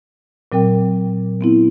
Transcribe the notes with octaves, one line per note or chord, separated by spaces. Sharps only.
A#2 F#3 C4 A#4 G5
B3 C4 E4